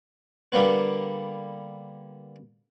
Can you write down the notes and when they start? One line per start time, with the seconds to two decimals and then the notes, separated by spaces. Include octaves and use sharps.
0.52 D3 G3 A#3 B3 B4